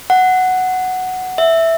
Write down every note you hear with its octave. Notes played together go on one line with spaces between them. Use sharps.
F#5
E5